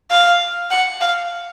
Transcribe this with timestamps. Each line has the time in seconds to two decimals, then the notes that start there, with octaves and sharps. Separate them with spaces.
0.11 F5
0.71 F#5
1.01 F5